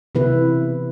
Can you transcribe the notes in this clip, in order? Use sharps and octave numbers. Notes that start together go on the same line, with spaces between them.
C3 E3 B3 E4 B4